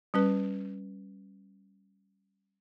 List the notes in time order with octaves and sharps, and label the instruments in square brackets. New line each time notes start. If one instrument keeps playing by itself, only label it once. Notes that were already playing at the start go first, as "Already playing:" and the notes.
[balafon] G3 C#4 B4